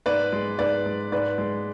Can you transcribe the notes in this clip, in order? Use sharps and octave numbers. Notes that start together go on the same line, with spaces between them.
G#2 B4 D5
G#3
G#2 B4 D5
G#3
G#2 B4 D5
G#3